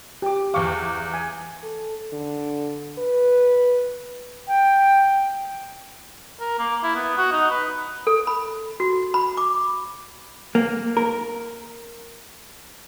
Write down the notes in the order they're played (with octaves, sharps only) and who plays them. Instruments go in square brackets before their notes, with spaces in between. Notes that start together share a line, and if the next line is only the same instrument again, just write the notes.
[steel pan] G4 D6
[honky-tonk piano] E2 D6 [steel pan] F5 C#6
[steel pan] G#5
[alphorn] A4
D3
B4
[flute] G5
[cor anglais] A#4
A#3
E4
B3
F#4
D#4
B4
[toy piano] A4
B5
F#4
B5
D6
[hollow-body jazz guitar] A#3
A#4